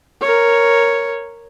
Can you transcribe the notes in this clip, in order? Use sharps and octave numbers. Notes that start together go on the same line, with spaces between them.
A#4 C#5